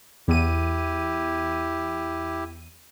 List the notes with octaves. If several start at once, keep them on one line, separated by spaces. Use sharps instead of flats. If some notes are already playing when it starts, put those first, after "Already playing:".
E2 E4 G4 D#7